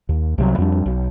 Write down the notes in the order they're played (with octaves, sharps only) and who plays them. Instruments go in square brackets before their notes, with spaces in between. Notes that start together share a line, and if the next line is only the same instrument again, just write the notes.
[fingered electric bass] D#2
C2 C3 F#3
F2 G3 D4
B1